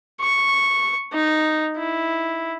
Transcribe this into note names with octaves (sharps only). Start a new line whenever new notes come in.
C#6
D#4
E4